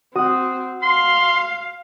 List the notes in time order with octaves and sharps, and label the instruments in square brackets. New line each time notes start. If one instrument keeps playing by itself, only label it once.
[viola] C4 [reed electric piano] F#4 [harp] F#5 D#6
[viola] F5 [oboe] C6